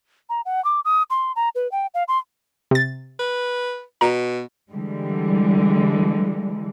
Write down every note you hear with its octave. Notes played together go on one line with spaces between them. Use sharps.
A#5
F#5
D6
D#6
C6
A#5
B4
G5
F5
C6
C3 A6
B4
B2 A#5
D3 E3 G3 G#3